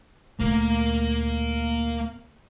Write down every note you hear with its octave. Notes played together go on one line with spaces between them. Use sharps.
D2 A#2 A#3